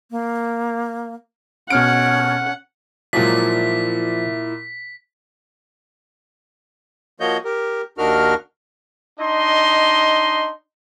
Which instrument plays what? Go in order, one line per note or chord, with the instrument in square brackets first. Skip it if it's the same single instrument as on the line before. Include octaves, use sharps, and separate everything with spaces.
[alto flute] A#3
[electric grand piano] B2 F6 D7 [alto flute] C#4 [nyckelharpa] F#5
[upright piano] A#2 F#3 G#3 [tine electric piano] F3 D5 [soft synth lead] E4 [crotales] B6
[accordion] F3 A#3 F#4 C#5 D#5 G6
G4 A#4
D#2 D4 D#4 F#4 A#4 F6
[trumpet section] D4 D#4 D#5 C6